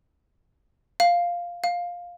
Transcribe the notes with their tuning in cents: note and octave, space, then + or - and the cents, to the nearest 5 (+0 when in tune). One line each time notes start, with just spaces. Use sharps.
F5 +0
F5 +10